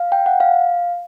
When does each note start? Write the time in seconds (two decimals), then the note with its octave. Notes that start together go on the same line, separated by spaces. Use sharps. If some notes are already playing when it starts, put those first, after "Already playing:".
Already playing: F5
0.12 G5
0.26 F#5
0.40 F5